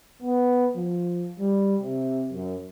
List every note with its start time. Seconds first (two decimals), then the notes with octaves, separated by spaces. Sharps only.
0.22 B3
0.76 F3
1.39 G3
1.81 C3
2.32 F#2